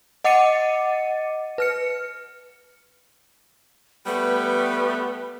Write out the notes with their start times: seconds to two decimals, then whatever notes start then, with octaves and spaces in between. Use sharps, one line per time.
0.24 D#5 F#5 D6 A6 C#7 D#7
1.58 B4 F6 C#7
4.06 G3 A3 B3 B4